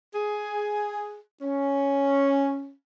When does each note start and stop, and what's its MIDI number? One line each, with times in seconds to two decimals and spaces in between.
0.15 1.18 68
1.42 2.72 61